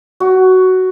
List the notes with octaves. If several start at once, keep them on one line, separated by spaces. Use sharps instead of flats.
F#4